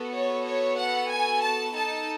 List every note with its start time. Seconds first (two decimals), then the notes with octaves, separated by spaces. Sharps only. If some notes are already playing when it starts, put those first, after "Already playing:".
Already playing: B3 F#4 A4
0.16 C#5
0.47 C#5
0.80 F#5
1.11 G#5
1.42 A5
1.75 D#4 A4 A5